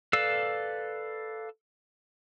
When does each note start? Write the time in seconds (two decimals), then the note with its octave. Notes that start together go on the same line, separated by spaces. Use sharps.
0.13 A4 B4 D5 F5 E6